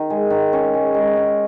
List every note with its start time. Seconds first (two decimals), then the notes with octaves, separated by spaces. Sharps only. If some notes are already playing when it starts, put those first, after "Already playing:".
Already playing: D#3
0.10 G#3
0.30 D#3
0.53 C#4
0.74 G#3
0.94 G#3
1.16 C#4